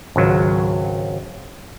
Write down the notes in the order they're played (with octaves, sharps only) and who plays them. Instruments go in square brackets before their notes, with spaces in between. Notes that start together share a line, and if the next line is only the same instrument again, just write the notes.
[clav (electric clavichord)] G#1 C#2 F#3